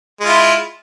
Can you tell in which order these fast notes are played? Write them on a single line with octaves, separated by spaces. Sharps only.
G#3 F4 E4